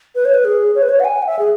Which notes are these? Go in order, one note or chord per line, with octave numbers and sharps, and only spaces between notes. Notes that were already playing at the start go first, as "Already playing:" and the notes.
B4
C#5
B4
G#4
C#5
B4
C#5
F#5
G#5
F#5
E5
G#4